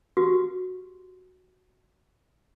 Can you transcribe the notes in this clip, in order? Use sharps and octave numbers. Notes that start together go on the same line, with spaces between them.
F#4 G4